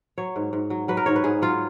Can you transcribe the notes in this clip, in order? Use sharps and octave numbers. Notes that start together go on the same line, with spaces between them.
F#3 C#5
G#2
G#2
F#3
F#3 B4
A#4
G#2 C#5
B4
G#2 G#4
F#3 F4